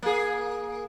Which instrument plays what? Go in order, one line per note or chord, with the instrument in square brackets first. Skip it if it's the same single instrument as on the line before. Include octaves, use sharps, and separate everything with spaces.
[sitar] A#3 G#4